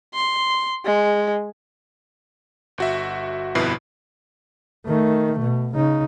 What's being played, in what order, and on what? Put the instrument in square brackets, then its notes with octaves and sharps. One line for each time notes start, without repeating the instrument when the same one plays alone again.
[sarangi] C6
G#3
[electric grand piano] G1 F#4 E5
G1 F2 B2 E4 B4 C7
[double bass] D#3 A3
B2
C#3 D#4